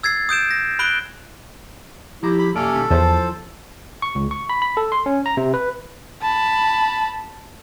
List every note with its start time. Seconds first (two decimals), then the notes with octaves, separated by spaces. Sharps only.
0.03 E6 G#6 A6 C7
0.29 D#6 G6 D7 E7
0.51 A#6
0.79 B5 F#6 D7 G7
2.23 F3 E4 G4 A#5
2.39 B5
2.54 F#2 C3 A#3 C#4 A4 D5
2.73 B2 D#3 G3
2.90 E2 E3 F3 C5 A5
4.02 C#6
4.15 C#2
4.31 C#6
4.49 B5
4.62 B5
4.77 A4
4.92 C6
5.06 C#4
5.26 A#5
5.37 C3
5.54 B4
6.22 A5 B5